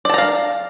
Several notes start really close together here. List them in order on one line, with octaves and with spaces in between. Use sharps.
D5 A5 A#5 F5